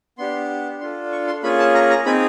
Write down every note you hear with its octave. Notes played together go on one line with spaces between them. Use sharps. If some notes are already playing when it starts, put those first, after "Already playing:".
B3 D4 G4 C6
D4 F4 A4 C6
C#6
C6
A#3 C#4 F4 G#4 B5
A5
A#5
A#5
C4 D#4 G#4 B5